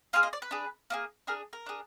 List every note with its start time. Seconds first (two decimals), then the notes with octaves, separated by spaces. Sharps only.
0.13 A#3 F4 G#4 F5
0.23 D#5
0.33 D5
0.42 B4
0.51 D4 G#4
0.90 A#3 D#4 G#4
1.27 D4 G#4 A#4
1.53 A#4
1.66 D4 G#4